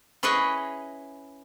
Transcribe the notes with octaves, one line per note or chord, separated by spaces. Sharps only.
C#4 E4 G#4 B4 C#5 D#5